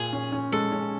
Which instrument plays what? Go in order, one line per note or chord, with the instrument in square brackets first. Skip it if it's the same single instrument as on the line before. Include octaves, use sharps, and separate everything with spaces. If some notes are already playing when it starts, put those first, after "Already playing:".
Already playing: [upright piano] A#2 [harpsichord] G#4
[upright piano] C#4
C#4
[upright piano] G#3 [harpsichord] A4
[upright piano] C#4